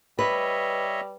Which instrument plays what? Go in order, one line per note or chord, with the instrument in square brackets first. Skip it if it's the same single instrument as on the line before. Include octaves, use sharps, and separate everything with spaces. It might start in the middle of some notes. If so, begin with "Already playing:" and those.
[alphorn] G3 [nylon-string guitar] B4 [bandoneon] C#5 D#5 E5